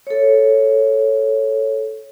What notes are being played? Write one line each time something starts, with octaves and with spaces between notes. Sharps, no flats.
A4 C#5